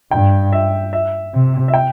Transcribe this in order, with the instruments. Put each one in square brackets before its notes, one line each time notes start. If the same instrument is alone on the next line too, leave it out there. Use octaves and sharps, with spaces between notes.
[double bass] G2 [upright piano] G5
[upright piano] E5
E5
[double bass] C3
[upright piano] E5
G5